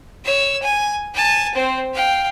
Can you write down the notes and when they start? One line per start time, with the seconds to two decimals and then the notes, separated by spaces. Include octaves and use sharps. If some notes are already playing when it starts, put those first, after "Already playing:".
0.25 C#5 E6
0.62 G#5
1.14 G#5 A5
1.54 C4 C5
1.94 F5 G5